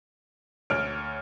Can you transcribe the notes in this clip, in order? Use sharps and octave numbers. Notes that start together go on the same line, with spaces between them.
D2 C#5 F6 D7